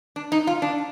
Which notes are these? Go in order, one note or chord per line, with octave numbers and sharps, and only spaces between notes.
D4
D#4
F4
D4